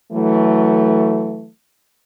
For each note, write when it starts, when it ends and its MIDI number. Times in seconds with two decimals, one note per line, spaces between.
0.12 1.48 52
0.12 1.48 54
0.12 1.48 57